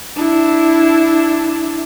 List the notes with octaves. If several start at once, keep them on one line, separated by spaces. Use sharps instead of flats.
D4 E4